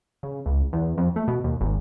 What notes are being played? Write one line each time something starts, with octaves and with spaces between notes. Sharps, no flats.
C#3
C#2
E2
F2
A3
B2
D#2
G#1